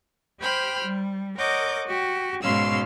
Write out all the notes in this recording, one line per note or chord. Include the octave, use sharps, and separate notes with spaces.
G4 C5 G5 B5 F6
G3
A#4 C#5 D#5 F#5 D6 G6
F#4 G4
G#2 B2 C#4 F5 C6 E6